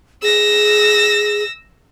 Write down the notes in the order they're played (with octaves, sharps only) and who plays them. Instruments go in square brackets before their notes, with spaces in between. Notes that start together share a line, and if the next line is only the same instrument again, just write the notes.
[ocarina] G#4 [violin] E6 A#6